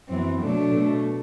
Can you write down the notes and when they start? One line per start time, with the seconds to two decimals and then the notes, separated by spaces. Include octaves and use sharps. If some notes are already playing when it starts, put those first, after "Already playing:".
0.08 F#2 E3 B3 C4
0.41 B2 F#3 A3 D4
0.74 B2 A3